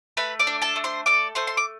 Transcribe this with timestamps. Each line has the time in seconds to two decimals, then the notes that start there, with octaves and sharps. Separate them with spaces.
0.17 A3 B4 B5
0.39 D5 D6
0.47 D4
0.62 A4 A5
0.76 A3
0.84 C5 C6
1.06 A4 D5 D6
1.35 A3 C5 C6
1.47 C6
1.57 D6